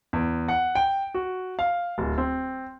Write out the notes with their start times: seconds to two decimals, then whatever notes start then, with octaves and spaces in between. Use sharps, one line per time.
0.13 E2
0.48 F#5
0.75 G5
1.14 F#4
1.59 F5
1.98 D1
2.18 C4